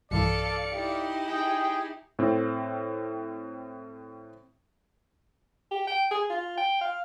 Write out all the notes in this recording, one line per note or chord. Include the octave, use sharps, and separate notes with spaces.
B1 G2 E3 A4 D5 F5 C#7
D#4 E4 G4
G#4 G5
A2 C4
G4
G5
G#4
F4
G5
F5